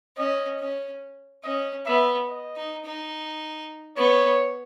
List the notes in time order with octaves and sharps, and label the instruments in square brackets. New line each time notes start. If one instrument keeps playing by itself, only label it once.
[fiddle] C#4 [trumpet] D#5
[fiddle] C#4
[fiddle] C#4 [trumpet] D#5
[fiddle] B3 [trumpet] E5
[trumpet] D#5
[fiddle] D#4
D#4
[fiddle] B3 [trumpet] C#5